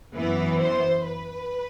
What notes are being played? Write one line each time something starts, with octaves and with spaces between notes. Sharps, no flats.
F#2 E3 B3 B4
C5
B4